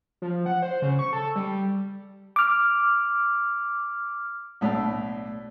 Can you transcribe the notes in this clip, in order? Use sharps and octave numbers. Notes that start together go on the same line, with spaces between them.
F3
F#5
C5
C#3
C#6
A4
G3
D6 F6
B1 A2 D4